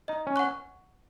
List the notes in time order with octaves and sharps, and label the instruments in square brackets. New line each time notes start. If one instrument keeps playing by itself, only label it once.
[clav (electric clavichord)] D#4 [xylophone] D#5
[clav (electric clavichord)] C#4
[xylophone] F#5 C#6 F#6